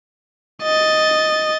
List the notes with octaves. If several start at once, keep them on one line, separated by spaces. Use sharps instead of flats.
D#5 A6